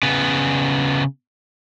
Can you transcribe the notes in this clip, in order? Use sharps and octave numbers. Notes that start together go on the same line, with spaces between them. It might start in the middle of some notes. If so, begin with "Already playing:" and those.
C#3 B3